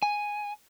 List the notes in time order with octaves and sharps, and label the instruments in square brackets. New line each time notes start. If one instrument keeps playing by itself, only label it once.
[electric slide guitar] G#5